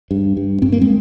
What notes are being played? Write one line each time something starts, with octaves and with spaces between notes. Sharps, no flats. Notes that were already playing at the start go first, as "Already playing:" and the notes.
G2
G2
G2 C4
A#3
G#3 C4